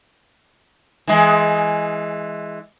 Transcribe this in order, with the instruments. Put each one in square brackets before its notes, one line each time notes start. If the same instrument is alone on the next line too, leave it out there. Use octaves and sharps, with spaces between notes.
[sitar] E3 G#3